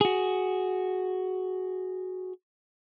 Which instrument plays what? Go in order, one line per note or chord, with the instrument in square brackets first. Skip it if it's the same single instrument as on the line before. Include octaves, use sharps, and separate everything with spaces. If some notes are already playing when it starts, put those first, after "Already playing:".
[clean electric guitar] F#4 G#4